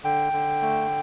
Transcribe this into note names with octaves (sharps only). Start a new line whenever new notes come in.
D3 G5
D3
A3